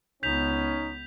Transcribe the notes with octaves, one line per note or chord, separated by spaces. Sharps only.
C#2 B3 C#4 D#4 G6 B6 F7